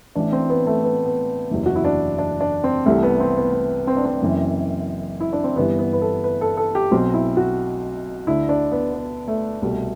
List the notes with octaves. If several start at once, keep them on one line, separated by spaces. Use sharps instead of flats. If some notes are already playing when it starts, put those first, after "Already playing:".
A1 A2 E3 D4
C4
B3
A3
B3
B3
F#1 E2 C3 E3
F#4
E4
D4
D4
D4
C4
C2 C3 E3 A3
B3
C4
B3
B3
C4
D4
C4
F#1 F#2 E3
E4
D4
C4
G1 G2 E3 B3
B3
B4
A4
B4
A4
A4
G4
B1 B2 C4
E4
F#4
D2 D3 E4
D4
B3
B3
A3
C2 B2 A3